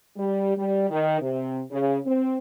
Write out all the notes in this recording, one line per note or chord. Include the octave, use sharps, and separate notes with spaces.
G3
G3
D#3
C3
C#3
C4